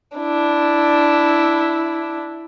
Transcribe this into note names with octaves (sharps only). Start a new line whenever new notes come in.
D4 E4